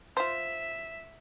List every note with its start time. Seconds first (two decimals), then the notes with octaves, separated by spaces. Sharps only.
0.17 F4 C5 E5